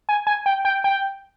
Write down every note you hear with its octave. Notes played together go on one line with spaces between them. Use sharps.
G#5
G#5
G5
G5
G5